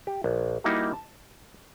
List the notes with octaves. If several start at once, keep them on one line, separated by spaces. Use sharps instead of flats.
G4
A#1
G3 A#3 D#4 E4 F#4
A5